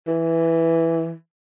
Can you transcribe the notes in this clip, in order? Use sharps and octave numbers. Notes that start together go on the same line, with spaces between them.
E3